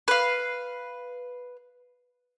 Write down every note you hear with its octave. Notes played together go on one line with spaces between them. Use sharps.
B4 F5